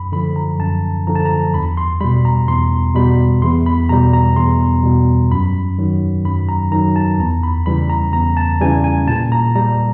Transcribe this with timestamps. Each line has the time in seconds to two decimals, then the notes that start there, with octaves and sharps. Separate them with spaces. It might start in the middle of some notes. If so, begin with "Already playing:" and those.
Already playing: F#2 B5
0.12 D3 F3 B5
0.36 A#5
0.59 F#2 A5
1.07 D3 F3 A#5
1.15 A5
1.25 A#5
1.54 E2 B5
1.77 C6
2.01 B2 G3 B5
2.25 A#5
2.48 E2 C6
2.95 B2 G3 B5
3.42 E2 C6
3.66 B5
3.89 B2 G3 A#5
4.13 A#5
4.36 E2 C6
4.83 B2 G3
5.31 F#2 B5
5.78 D#3 F#3
6.25 F#2 B5
6.49 A#5
6.72 D#3 F#3 A#5
6.96 A5
7.19 E2 A#5
7.43 B5
7.66 C#3 E3 G3 B5
7.90 A#5
8.13 E2 A#5
8.37 A5
8.61 C#3 E3 G3 G#5
8.84 G#5
9.07 A#2 A5
9.32 A#5
9.56 G3 A#5